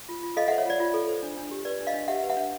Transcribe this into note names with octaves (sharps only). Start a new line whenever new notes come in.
F4
F4
A4 D#5 F5
E5 F#5
C5
C#5
F4 D5
F4
A4
C5
D4
D4
G4
B4 D5
D4
D#5 F5
D4
G4 E5 F#5
B4
E5 F#5
D4